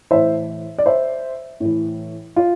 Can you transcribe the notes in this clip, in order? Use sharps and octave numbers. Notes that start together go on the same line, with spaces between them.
A2 E3 C5 E5
D5
C5 E5
A2 E3
F4